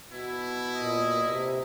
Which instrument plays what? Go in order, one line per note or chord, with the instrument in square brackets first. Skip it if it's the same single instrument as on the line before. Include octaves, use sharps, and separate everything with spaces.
[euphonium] B2 [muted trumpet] E4
[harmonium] A#2 [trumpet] D#5
[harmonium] C3